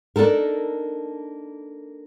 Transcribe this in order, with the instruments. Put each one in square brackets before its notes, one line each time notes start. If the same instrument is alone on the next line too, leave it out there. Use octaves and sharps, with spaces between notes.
[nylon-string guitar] A#3 D4 D#4 A4 A#4